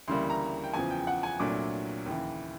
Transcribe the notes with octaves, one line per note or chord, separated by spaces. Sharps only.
D2 C#3 E3 G3 A#3 C6
A#5
G5
E2 C#3 F3 G#5
G5
F#5
G#5
C2 A#2 F#3 A3 D4 D6
D#2 C#3 E3